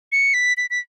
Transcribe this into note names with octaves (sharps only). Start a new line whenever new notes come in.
C#7
B6
B6
B6